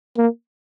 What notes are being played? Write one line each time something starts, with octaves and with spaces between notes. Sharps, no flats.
A#3